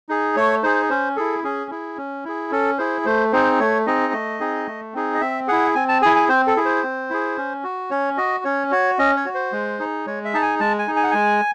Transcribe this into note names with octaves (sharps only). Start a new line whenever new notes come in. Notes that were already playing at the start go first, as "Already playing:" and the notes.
D#4 G#4
A3 C#5
D#4 G#4 C5
C#4 C5
E4 G#4 A4
C#4 G#4
E4 G#4
C#4
E4 G#4
C#4 A4
E4 G#4 C5
A3 C5
C4 D#4 G#4 C5
A3 C#5
C4 D#4 G#4 D#5
A3
C4 D#4 G#4
A3
C4 D#4 G#4
D#5
C4 E5
E4 G#4 F#5
C4 G#5
A5
E4 G#4 G#5
G#5
C4 C5
A4
E4 G#4
C5
C4
E4 G#4
C#4
F#4
C#4 C#5
F#4 D#5
C#4 C#5
F#4 C#5
C#4 D#5
C#5
F#4
C5
G#3
D#4 G#4
G#3 C#5
E5
D#4 G#4 A5
G#5
G#3 A5
G#5
D#4 G#4
G#5
F#5
G#3 G#5